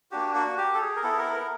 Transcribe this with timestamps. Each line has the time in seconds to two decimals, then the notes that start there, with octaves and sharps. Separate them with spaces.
0.11 A#3 D4 F#4 G4
0.34 F#4
0.58 G4
0.74 A4
0.81 G#4
0.96 A#4
1.03 B3 E4 A4
1.18 A#4
1.34 A#4